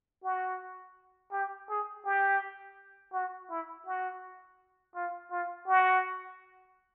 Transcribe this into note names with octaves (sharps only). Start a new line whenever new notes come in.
F#4
G4
G#4
G4
F#4
E4
F#4
F4
F4
F#4